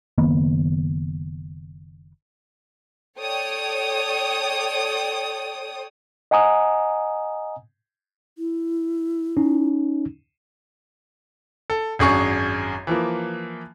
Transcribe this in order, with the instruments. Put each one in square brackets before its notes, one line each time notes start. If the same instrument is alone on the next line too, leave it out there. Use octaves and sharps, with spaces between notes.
[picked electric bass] F#1 D#3 A#3 B3
[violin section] A4 C#5 D5 G5 D#6
[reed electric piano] D#5 F#5 G#5 A#5 D#6
[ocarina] E4
[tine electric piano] C#4 D#4
[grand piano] A4
G#1 F#2 D4 G#4 C#5 C#6
E3 F3 A#3